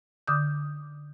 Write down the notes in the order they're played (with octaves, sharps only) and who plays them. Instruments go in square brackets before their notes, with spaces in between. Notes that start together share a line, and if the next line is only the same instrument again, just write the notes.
[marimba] D3 D6 D#6 G6